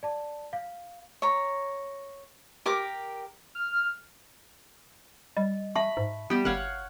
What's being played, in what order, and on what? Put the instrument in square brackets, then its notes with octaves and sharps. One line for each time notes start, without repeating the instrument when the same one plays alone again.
[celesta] D5 A5
F5
[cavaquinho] C#5 A#5
G4 A#4 D6
[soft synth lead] F6
[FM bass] G3 [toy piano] D#5
[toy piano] E5 A5 C#6 [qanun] B5
[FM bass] G#2
[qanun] G3 G4 [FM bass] B3
[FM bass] G1 [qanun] C#5 F5 F#5